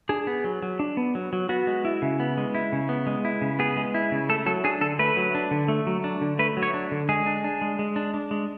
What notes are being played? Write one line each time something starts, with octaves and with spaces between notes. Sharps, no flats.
D4 G#4
B3
F#3
F#3
D4
B3
F#3
F#3
B3 F#4
G#3
E4
C#3
B3
G#3
E4
C#3
B3
G#3
E4
C#3
B3 G#4
G#3
E4
C#3
A3 A4
F#3 A4
D4 G#4
D3 A4
A3 B4
F#3
D4
D3
A3
F#3
D4
D3
A3 B4
F#3
C#5
D4
D3
G#3 G#4
D4
D4
G#3
G#3
D4
D4
G#3